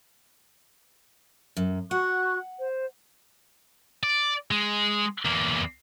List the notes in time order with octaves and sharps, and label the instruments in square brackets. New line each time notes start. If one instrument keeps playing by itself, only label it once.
[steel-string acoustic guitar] F#2
[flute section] F#4 C#6 F#6 [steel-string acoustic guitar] F#5
[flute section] C5
[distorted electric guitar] D5
G#3
E2 A#3